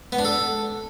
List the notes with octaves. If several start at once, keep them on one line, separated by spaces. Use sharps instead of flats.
B3
D4
A4